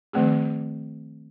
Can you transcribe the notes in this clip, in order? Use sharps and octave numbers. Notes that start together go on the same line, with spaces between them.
D#3 F3 A3 C4 G#4